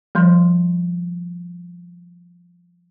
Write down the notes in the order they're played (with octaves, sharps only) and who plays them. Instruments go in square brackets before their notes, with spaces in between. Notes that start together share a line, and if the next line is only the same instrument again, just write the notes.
[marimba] F3 G3 C6